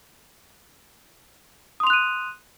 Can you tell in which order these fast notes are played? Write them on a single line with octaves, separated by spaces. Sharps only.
D#6 C6 F7 F#6 D#7